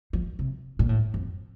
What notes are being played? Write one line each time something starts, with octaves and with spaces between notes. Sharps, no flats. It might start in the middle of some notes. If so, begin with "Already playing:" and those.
F3
C3
A#2
A2
F2